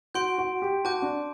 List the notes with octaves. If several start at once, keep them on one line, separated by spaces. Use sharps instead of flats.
F#4 C6 G6 D7
F#4
G4
F#4 A5 D6 G6
D4